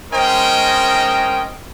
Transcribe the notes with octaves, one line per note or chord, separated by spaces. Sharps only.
G#3 C#4 A#4 C5 D#5 G5